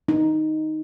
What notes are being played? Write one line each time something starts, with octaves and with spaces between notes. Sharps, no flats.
D#4